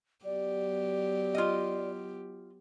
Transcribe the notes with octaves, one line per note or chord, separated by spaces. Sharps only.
F#3 B3 G4 D5
F4 D#5